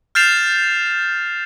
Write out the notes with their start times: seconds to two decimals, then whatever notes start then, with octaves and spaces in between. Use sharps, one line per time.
0.15 F6 G6 A6 C7 E7 F7